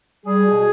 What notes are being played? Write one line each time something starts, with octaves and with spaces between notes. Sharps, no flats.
G3 G#4
B2